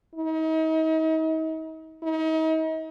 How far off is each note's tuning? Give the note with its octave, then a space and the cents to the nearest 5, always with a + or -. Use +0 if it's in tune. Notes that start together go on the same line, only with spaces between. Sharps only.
D#4 +40
D#4 +40